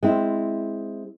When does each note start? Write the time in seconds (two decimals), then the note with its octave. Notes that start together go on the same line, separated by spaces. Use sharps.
0.03 G#3 C4 E4